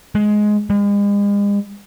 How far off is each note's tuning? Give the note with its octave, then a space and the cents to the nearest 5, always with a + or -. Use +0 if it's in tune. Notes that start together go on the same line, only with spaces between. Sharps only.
G#3 +10
G#3 -40